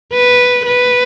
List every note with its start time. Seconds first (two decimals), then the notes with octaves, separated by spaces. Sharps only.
0.13 B4
0.67 B4